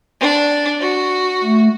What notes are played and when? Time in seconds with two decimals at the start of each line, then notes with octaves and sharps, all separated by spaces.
0.21 D4
0.80 F#4
1.44 A3